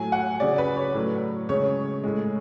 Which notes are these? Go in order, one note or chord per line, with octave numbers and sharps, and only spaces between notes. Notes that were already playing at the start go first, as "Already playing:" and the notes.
Already playing: A2 F#3 G#5
F#5
C#3 F#3 D5
B4
C#5
A2 F#3
C#3 G#3 C#5
A2 G#3